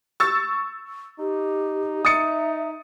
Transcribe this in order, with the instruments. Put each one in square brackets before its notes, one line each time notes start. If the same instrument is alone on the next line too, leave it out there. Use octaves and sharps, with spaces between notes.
[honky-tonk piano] C#6 E6 A6
[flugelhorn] D#4 [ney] G4
[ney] E5 [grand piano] D#6 A6 C#7